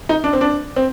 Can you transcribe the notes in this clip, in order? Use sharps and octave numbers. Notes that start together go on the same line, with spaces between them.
D#4
D4
C4
D4
C4